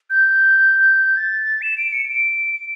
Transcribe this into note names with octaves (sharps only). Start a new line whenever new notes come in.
G6
A6
E7
D7
C#7
D7
D7